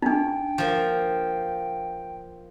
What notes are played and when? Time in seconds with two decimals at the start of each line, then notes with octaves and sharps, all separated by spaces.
0.02 D4 D#4 G5
0.58 F3 A#3